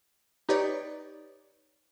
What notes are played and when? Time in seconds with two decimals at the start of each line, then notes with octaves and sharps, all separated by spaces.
0.49 D#4 G4 B4 C#5 D5